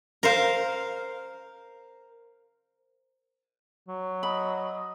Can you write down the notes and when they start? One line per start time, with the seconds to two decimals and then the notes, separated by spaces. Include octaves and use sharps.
0.23 A#4 C5 F5
3.88 F#3
4.23 D#5 B5